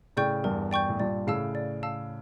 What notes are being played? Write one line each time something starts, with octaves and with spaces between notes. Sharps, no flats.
A2 C#3 D5 G5 C#6 G6
E2 G2 A#4
D5 G5 C#6 G6
A2
G2 A#2 D5
A2 C#3 F5 A5 E6
D5
F5 A5 E6